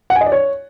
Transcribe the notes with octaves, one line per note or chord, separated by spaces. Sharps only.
F#5
G#5
D#5
D5
C#5